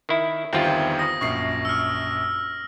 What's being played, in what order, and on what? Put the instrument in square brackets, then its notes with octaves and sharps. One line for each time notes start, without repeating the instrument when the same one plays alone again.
[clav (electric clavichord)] D#3 E4
[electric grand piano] G1 E2 D#3 [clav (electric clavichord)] C4 F4 [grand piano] G4 E5
[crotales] D#6 A#6
[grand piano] A#1 F#2 C7 [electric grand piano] C#6
[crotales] E6 F6